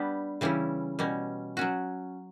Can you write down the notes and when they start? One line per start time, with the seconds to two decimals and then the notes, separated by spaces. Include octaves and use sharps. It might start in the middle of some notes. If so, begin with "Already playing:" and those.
Already playing: G3 B3 D4 G4
0.41 C#3 E3 G3 C#4 E4
0.99 B2 G3 C#4
1.57 F#3 C#4 F#4